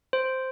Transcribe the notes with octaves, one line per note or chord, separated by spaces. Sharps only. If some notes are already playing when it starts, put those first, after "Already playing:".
C5